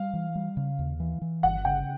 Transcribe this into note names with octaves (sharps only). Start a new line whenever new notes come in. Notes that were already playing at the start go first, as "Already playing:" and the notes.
Already playing: G3 F5
E3
G3
C#3
D#2
E3
E3
G1 F#5
C#3 G5